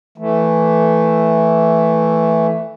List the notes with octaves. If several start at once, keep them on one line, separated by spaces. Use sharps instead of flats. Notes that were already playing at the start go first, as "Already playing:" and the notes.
E3 A3